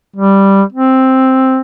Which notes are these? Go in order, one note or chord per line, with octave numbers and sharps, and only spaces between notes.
G3
C4